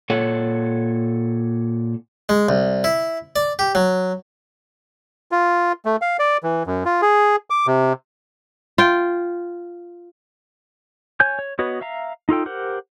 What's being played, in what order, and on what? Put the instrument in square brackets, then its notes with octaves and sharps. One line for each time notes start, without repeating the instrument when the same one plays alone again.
[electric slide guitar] A#2 A4 C#5 F#5
[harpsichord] G#3
C2
E4
D5
G4
F#3
[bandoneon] F4
A3
F5
D5
E3
F#2
F4
G#4
D6
C3
[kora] F4 G5
[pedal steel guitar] C#5 G#5 G6
C#5
B3 F#4 B4 C#5 D#5
E5 F5 A#5
D#4 F4 A4 G5
G4 A#4 C5 F#5